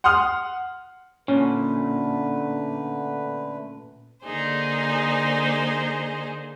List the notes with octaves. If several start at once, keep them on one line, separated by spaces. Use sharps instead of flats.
F#5 C6 D#6 F6
A#2 D3 A3 C#4 B4
D3 A#3 D#4 G#4 C5